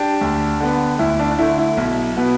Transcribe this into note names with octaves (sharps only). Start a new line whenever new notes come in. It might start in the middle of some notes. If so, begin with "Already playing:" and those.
Already playing: D4 G4
D2
D3 B3
D2 E4
D4
D4
D3 A3 E4
E4
B1
B2 B3